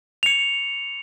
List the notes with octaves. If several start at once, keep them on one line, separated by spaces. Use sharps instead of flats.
C#7 F7